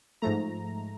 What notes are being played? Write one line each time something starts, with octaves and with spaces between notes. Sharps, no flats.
G#2 F3 A3 A#5